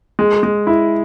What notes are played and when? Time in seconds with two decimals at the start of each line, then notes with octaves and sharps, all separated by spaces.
0.19 G#3
0.43 G#3
0.67 E4